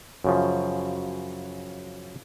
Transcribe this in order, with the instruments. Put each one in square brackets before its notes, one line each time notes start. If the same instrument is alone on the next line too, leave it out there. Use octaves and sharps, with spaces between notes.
[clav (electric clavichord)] F#2 C#3 F3